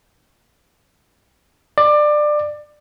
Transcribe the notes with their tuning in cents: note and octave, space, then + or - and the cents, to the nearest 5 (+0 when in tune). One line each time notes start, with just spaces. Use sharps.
D5 +20